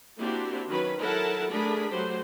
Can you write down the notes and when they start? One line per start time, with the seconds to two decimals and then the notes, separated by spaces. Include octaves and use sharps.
0.18 A#3 C4 D4 E4 F#4 G4
0.69 D#3 F#3 C#4 B4 B5
0.99 F#3 E4 A4 A#4 F#5 A5
1.51 A3 D4 G#4 A#4 B5
1.91 F#3 A3 F#4 G4 C5